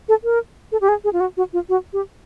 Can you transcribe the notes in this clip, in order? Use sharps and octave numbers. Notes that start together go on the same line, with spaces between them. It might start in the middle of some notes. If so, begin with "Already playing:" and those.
A4
A#4
A4
G4
G#4
G#4
F4
F#4
F#4
F4
F#4
G4